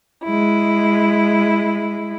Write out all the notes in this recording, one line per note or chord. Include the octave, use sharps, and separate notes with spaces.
G#3 E4